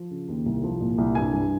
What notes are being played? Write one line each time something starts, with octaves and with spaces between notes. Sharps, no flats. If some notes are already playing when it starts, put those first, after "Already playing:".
Already playing: F3
C#3
D#2
C2
F3
A#2
C2
G2 G#5
G2